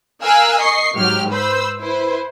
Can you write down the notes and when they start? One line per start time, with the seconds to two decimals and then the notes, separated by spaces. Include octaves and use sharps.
0.23 A#4 F5 G#5 E6 F#6
0.60 D#5 C#6 C7
0.96 G#2 F#3 G4 F6
1.30 B4 C5 B5 E6
1.81 E4 B4 C5